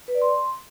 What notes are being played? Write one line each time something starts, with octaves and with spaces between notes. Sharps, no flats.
B4
D5
C6